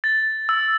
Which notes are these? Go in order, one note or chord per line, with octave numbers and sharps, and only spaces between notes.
A6
E6